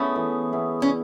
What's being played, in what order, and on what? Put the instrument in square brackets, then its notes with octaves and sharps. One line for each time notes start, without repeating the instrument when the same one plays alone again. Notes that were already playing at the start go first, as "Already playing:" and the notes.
Already playing: [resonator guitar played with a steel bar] A3 C#4 [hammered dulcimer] B3 E4 G#4
[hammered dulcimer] E3
B3 E4 G#4
[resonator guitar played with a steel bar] C#4